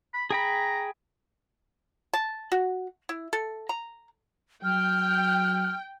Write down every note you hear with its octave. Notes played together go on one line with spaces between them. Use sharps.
B5
G#4 G5 A#5 B5
A5
F#4
E4
A4
A#5
F#3 G5 F6